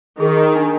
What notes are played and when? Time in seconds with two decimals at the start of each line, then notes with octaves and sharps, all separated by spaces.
0.20 D#3 G#4
0.37 A#5
0.55 D4